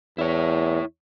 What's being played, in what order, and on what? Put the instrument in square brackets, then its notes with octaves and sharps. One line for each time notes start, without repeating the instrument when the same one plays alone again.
[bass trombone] E2 [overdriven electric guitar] E4 C#5